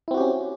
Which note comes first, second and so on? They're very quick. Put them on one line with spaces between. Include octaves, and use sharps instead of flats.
E4 C4 F#4 G4 C#4